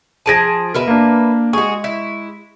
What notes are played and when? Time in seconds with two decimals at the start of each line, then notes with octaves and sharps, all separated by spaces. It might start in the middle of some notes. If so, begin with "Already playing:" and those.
0.26 F3 G#4 A5 A#6 D7 D#7
0.74 B2 A#4 B4 E5
0.88 A#3 D4
1.53 G#3 F#4 G#4 C#6
1.84 E4